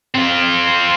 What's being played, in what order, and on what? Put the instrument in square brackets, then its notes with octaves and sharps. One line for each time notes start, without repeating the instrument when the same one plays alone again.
[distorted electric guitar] C4 F4